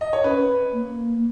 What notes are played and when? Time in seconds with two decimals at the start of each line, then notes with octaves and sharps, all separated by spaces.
0.01 D#5
0.13 C#5
0.24 C#4 B4
0.73 A#3